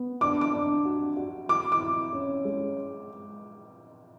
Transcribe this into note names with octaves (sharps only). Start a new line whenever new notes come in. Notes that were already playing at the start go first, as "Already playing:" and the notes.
Already playing: B3
D4 D6
D6
D4
F#4
F#4
E4 D6
D6
E4
C#4
G#3